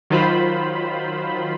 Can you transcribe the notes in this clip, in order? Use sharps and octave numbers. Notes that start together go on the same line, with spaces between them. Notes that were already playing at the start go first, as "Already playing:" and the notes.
D#3 F#3 F4 C5 B5